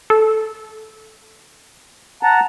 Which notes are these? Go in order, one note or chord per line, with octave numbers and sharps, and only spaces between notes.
A4
F#5 A5 A#5